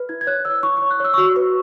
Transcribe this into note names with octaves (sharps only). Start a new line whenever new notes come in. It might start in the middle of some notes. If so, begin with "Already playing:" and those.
Already playing: B4
E4 G#6
G#6
C#5 F#6
C#5 E6
E4 C#6
C#6
C#5
F#6
C#5 E6
C#6
F#4 E6
B4 C#6